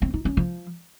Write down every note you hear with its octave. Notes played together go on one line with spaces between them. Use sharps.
C4
D#4
C#4
F3